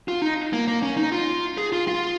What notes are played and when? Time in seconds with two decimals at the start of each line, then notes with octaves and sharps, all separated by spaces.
0.08 F4
0.22 D#4
0.53 A#3
0.68 A#3
0.83 C#4
0.97 D#4
1.12 F4
1.58 G#4
1.72 F4
1.88 F4